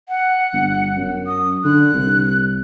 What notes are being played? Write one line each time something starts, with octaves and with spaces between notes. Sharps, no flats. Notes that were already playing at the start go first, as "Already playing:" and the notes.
F#5
G1
F#2
D#6
D3 F#6
C2